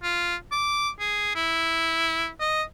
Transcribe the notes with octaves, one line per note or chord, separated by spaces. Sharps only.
F4
D6
G#4
E4
D#5